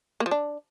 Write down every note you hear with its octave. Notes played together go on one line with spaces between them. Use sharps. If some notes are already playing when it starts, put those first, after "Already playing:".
A#3
F3
D4